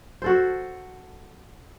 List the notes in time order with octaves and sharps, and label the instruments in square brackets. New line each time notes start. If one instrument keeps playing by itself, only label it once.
[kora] F#4 A4 C5